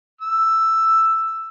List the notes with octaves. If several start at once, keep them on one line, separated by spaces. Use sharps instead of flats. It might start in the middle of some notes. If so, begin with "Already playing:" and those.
E6